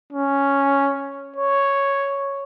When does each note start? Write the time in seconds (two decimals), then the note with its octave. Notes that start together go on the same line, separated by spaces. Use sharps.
0.12 C#4
1.36 C#5